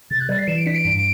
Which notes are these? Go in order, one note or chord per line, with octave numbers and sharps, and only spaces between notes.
C3 A6
F#6
G3 A6
C7
E3 E7
D7
D4 B6
D7
G2